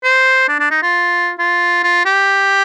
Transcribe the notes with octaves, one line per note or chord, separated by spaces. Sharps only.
C5
D4
D4
D#4
F4
F4
F4
G4